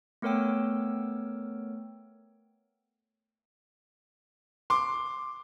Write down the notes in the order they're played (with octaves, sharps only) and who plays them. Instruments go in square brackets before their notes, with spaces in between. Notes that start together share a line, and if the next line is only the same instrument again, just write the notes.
[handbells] A3 B3 A#4 C#5 G5 E6
[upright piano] C6 D6